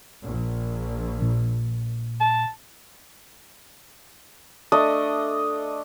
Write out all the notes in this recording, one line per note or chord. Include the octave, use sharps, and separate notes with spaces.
A#1
A#2
A5
A3 D4 D#5